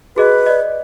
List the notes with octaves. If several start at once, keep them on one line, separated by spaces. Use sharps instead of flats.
F#4 G#4 B4 D#5
D5 D#5